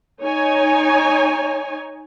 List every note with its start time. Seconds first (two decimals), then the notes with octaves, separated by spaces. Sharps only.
0.22 D#4 C#5 G#5